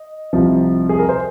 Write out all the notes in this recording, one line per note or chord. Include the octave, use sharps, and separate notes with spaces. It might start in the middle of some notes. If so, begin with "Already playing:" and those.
Already playing: D#5
C2 C3 F3
G#4
A#4
C5